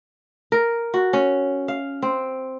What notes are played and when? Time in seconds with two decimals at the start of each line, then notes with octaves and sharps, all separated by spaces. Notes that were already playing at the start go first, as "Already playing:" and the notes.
0.52 A#4
0.94 F#4
1.13 C#4
1.68 F5
2.02 C4